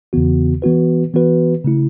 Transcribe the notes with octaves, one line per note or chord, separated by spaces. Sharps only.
E2 C#3 E3 B3 F#4
E3 B3 F#4 B4
E3 B3 F#4 B4
C#3 A3 E4